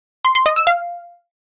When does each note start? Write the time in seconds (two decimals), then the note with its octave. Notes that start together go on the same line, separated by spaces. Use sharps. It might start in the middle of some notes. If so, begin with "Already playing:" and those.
0.25 C6
0.35 C6
0.46 D#5
0.56 E6
0.67 F5